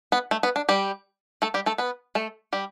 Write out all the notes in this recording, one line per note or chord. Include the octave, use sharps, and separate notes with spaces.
B3
A3
B3
D4
G3 G4
A3 A4
G3 G4
A3 A4
B3 B4
A3 A4
G3 G4